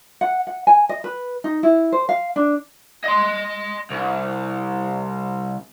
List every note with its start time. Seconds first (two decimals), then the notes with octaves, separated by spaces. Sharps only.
0.21 F#5
0.47 F#5
0.67 G#5
0.89 D#5
1.04 B4
1.44 D#4
1.63 E4
1.92 C5
2.09 F5
2.36 D4
3.04 D#5 C6
3.91 C2